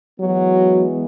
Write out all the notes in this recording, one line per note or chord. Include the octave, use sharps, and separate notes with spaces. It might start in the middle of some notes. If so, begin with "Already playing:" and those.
E3 F#3 G#3 B3 F#4